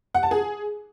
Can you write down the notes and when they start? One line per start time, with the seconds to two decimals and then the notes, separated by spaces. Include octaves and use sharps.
0.15 F#5
0.23 A5
0.31 G#4